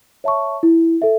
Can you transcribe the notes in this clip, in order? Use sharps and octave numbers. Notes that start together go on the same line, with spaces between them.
C#5 E5 A5 C#6
E4
A4 E5